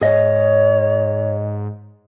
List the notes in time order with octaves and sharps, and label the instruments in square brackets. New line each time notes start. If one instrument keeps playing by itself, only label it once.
[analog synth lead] G#2 [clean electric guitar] G#4 D#5 [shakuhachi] C#5